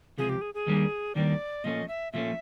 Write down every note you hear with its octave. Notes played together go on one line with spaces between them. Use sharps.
C#2 C3 F3 G#4
G4
G#4
G#4
D#2 D#3 G3 A#3 D4
D#2 D#3 G3 A#3 D4 D5
A#2 F3 A3 C#4 D#5
E5
A#2 F3 A3 C#4 E5